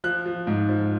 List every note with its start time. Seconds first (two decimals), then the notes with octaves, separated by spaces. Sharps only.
0.04 F3 F#6
0.26 F3
0.47 G#2
0.69 F3